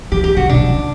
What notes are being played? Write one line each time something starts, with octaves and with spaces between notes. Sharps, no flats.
E3 G4
G4
D3 F#4
B2 D4
B2
C#3